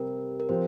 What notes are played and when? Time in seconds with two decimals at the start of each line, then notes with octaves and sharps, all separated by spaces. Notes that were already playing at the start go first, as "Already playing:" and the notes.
Already playing: C3 G3 C4 A#4
0.40 A#4
0.49 F3 C4 G4 C5